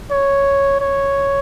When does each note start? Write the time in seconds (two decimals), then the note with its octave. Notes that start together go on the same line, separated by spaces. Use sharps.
0.11 C#5
0.81 C#5